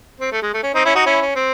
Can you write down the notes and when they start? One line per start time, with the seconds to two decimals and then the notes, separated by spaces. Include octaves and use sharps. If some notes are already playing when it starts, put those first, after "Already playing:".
0.21 C4
0.32 A3
0.42 G#3
0.54 A3
0.63 C#4
0.74 C4 D#4
0.85 C#4 E4
0.95 D#4 F#4
1.06 C#4 E4
1.21 C#4
1.36 C4